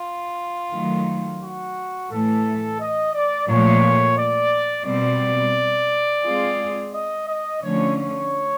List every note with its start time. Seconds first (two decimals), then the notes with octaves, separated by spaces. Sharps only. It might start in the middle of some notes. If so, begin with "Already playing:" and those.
Already playing: F4
0.72 D#3 F#3 A3
1.41 F#4
2.10 A2 E3 A3 A4
2.79 D#5
3.13 D5
3.48 A#2 F3 A3 C#5
4.17 D5
4.85 B2 G3 C4 D5
6.23 G#3 C4 F4 G#4
6.93 D#5
7.27 D#5
7.62 D3 F3 A3 C#4 C#5
7.96 C#5